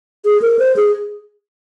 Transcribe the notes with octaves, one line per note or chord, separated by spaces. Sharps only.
G#4
A#4
C5
G#4